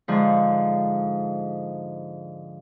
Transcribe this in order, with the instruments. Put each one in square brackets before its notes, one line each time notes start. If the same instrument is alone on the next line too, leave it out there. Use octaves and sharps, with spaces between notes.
[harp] G#2 D3 F3